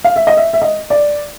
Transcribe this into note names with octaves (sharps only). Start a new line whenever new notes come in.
F5
E5
D#5
E5
E5
D#5
D5